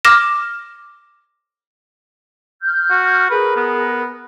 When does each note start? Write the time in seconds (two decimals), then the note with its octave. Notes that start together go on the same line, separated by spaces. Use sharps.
0.05 D6 F6 A#6 E7
2.61 F6 G6
2.90 F#4
3.30 G#4 A#4 B4
3.56 B3